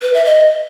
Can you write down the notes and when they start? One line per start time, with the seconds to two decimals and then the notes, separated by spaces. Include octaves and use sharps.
0.02 B4
0.14 E5
0.25 D#5